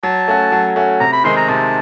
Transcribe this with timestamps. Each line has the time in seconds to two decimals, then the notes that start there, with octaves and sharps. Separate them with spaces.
0.03 F#3 A5
0.28 A3 C#4 F#4
0.52 F#3
0.76 A3 C#4 F#4
1.00 C3 A#5
1.12 B5
1.24 D#3 G#3 C4 D#4 C6
1.36 A#5
1.49 C3 A5